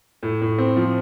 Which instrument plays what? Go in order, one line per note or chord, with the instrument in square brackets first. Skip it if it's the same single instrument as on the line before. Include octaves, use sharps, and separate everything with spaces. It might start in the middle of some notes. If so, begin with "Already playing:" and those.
[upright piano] A2
A2
C4
F3